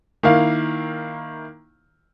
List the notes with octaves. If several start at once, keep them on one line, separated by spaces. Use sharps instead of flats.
D#3 A#3 E4 F5